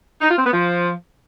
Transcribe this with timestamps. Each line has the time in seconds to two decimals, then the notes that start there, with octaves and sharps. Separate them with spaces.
0.21 D#4
0.29 F4
0.37 C4
0.45 B3
0.53 F3